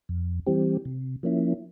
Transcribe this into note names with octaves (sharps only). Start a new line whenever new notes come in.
F2
E3 G3 C4 G4
C3
F3 A#3 C#4 E4